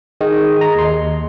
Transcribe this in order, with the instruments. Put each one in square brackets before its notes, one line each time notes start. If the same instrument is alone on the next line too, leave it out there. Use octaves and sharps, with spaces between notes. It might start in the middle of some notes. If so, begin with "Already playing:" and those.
[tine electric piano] D#3 [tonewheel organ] G#4 D#5
[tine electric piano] A#5
D#2 C6